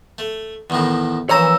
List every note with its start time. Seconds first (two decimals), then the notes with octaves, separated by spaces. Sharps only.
0.18 A3
0.70 E2 A2 D#3
1.29 A#1 E3 C#4 C5 C#5 A#5 D#6 E6